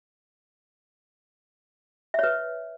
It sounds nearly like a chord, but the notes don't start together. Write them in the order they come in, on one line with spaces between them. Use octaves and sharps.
E5 C#5 B4